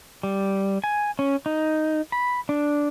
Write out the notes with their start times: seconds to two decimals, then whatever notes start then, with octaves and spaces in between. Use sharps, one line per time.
0.23 G3
0.84 G#5
1.19 C#4
1.46 D#4
2.12 B5
2.49 D4